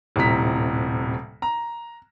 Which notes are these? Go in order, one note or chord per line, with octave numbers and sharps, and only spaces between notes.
D#1 A2 C3 A#5 B6
A#5